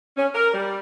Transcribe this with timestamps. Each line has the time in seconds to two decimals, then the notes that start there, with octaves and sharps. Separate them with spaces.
0.17 C#4
0.35 A#4
0.54 G3